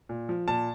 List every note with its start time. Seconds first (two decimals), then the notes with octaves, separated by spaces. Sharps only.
0.09 A#2
0.29 F3
0.48 A#2 A5